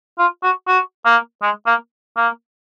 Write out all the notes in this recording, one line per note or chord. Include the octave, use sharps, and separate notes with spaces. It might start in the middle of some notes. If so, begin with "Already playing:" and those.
F4
F#4
F#4
A#3
G#3
A#3
A#3